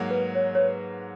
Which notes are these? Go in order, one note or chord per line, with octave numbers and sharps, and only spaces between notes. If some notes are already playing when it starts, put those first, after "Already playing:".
Already playing: G#2 F#3 A#3
B4
C#5
C#5
B4